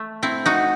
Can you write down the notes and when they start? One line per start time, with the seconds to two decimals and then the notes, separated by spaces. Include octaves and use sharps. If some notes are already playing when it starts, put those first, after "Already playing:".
Already playing: A3
0.23 C4 E4
0.46 D#4 F#4